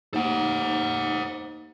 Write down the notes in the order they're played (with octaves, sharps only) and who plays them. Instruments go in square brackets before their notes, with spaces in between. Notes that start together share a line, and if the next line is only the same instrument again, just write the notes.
[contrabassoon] D#2 [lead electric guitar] C5 F#5